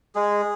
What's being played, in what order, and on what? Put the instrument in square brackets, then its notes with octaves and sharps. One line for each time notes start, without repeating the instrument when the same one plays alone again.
[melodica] G#3 G#4